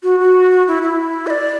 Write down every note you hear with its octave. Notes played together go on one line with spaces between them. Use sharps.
F#4
F#4
E4
E4
E5
D5